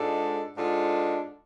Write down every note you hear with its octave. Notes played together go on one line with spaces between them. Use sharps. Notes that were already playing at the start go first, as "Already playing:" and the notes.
Already playing: G#2 G#3 D4 F4 A4
G#2 G#3 D4 F4 A4